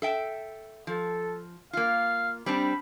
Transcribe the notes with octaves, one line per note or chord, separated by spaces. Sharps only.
A4 E5 G5
F3 A4
A#3 F4 F5
G3 C4 D4 B5